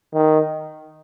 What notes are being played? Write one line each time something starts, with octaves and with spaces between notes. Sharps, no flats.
D#3